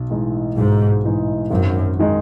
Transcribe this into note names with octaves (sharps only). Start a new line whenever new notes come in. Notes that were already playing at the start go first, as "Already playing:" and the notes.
Already playing: B1
A2 E3 G#3 D#4
B1 G#2
A2 E3 G#3 D#4
G#1 F#2
D#3 G#3 D#4